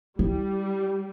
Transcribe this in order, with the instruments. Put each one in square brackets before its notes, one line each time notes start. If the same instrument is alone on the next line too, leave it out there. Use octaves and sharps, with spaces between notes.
[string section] G3 [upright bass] E4